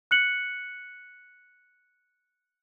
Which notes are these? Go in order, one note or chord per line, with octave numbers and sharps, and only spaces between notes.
F#6 C#7 F#7